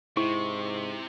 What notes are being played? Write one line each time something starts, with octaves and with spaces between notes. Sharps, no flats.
G#2 C3 E4 C#6